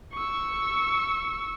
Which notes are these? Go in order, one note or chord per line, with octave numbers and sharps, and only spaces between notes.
C#6 E6